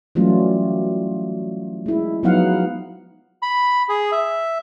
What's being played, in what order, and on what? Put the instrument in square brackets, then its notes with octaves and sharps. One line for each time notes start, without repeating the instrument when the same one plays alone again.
[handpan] E3 F#3 G3 A3 C#4 F4
G#3 E4
F3 F#3 B3 D#4 F5 F#5
[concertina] B5
G#4
E5